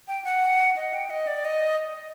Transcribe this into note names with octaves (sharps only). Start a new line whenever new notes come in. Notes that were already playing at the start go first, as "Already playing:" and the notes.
G5
F#5
D#5
G5
D#5
D5
D#5